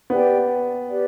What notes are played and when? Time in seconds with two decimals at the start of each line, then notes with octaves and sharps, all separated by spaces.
0.10 B3 G4 D5 G5
0.90 G4 B4 D5